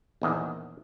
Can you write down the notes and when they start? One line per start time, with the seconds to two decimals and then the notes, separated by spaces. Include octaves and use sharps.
0.22 A#1 E2 D#3